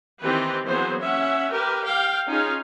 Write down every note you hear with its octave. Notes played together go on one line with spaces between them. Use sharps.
D#3 E3 C4 G4 B4
E3 F#3 A#3 B3 G#4 C5
C#4 E5 F#5
G4 A#4 B4
F5 G5
C#4 D#4 F4 G#4 F5